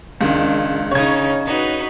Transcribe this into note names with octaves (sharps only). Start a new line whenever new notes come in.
C#2 D#3 D4
C#3 D#4 C#5 G#6
D#4 F#4 B4